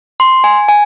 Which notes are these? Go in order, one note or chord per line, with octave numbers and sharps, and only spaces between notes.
C6
G#5
G#5